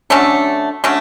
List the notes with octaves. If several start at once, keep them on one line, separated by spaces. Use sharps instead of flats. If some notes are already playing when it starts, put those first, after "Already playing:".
D3 F#3 A3 C#4 A4
D3 F#3 A3 C#4